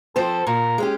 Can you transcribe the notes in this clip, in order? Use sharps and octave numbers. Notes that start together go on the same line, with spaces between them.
F3 C4 A4 C5
A#2 A#4
G#3 C#4 G4